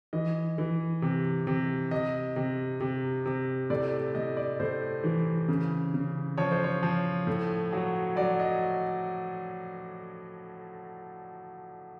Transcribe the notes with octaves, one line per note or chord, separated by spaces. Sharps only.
E3 D#5
E3
C3
C3
C3 D#5
C3
C3
C3
A2 D5
A2 D#5
D5
A2 C5
E3
C#3
C#3
F3 C#5
C5
C#5
F3
A2
F#3
F#3 D5
D#5